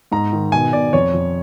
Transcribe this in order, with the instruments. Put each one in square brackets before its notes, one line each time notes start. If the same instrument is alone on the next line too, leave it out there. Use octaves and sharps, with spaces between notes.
[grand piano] G#2 A#5
D#3
B2 G#5
B2 D5
F2 C#5
F2